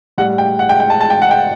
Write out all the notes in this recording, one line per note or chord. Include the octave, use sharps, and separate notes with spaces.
A2 G3 F#5
G5
F#5
G5
G5
A5
A5
G5
F#5
G5